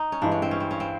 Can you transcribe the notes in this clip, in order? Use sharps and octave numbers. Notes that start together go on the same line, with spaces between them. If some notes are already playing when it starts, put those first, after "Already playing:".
Already playing: D#4
C#4
G2 E3 G#3 D4
C#4
C4
C#4
C4
C#4
C4